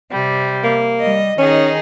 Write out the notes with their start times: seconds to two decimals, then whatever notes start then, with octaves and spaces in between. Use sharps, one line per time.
0.11 C3 G3
0.64 A#3
1.00 G3 D#5
1.39 D#3 C#4 D#4 G#4